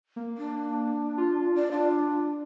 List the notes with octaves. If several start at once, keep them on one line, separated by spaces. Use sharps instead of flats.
A#3
D4
F4
D5
D4 F4